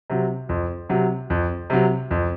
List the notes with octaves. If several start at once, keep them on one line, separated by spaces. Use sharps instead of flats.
C3 F#3
F2
C3 F#3
F2
C3 F#3
F2